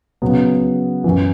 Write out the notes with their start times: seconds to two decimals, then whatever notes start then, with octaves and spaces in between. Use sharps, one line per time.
0.22 C#3 F#3 B3
1.04 F#2 E3